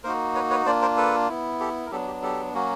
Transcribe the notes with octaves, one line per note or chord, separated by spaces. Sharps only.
A#3 D#4 F#4 A#4 C5
B4 C#5
B4 C#5
A#3 D4 F4 C5 D5
A#4 C5
A4 B4
B3 E4
G4 A4
A#4
F#3 B3 D4 G4 A4
G4
G4 A4
F#3 A#3 C#4 F#4